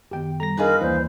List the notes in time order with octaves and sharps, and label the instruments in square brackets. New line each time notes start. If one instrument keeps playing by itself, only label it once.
[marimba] F#2 D#3 B3 [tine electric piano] G4 G5
[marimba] G3 A4 [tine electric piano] A#5 A#6
[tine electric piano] D#3 [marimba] D4 D#5 [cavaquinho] F4 G#4 B4 [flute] A#4
[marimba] D#2 A#3 D5 [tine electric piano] E3 [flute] C5